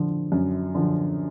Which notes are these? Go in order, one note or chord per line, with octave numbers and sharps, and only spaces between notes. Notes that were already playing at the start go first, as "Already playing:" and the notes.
Already playing: D3 F3
F#2
D3 F3